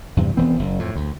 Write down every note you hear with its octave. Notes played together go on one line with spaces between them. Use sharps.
E2 G2 C3
E1 E3 B3 C4
F#1
F2 A2
D2